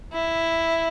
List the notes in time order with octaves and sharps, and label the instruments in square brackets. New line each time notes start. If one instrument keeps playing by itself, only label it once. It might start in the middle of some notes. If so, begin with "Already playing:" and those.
[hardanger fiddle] E4